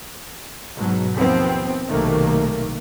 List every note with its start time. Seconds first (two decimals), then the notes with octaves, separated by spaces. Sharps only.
0.77 G#2 B2 F#3
1.16 D#2 F3 B3 C4
1.89 B1 C3 D#3 A3 A#3